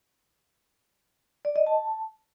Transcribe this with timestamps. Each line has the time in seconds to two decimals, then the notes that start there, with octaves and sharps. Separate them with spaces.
1.45 D5
1.56 D#5
1.67 A5